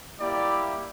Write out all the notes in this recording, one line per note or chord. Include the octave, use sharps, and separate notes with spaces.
G3 A#3 E4 G4 D5